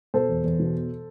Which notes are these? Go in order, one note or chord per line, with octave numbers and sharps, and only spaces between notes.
B2 A4 C5
E2
E2
B2